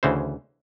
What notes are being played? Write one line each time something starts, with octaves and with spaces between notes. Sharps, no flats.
D2 C#3 E3 C5